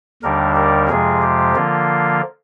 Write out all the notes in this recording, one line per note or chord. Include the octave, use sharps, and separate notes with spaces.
D#2 D3 G3 D4 A#4
A#4
F2 C3 F3 G#3 G#4
G4
D3 F3 A#3 F4